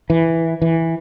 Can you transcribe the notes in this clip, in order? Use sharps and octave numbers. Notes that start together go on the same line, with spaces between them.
E3
E3